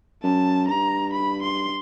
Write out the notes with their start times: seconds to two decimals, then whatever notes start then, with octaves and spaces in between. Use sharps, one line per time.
0.23 F#2 A5
0.68 G2 A#5
1.13 B5
1.42 C6